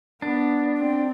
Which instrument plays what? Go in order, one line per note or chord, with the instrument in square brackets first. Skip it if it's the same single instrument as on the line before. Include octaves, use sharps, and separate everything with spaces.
[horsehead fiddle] B3 [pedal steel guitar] D4
[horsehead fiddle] C4